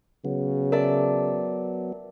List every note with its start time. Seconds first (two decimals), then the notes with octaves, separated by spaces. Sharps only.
0.25 C#3 F#3 B3
0.72 A#4 D5 E5 A5